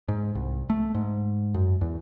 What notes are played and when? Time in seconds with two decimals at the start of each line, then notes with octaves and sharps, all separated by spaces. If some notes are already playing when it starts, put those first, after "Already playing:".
0.08 G#2
0.35 C2
0.70 A3
0.94 G#2
1.54 F#2
1.81 E2